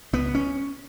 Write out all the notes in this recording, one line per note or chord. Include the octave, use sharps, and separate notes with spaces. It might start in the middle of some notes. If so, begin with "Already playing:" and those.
C#2 B3
C#4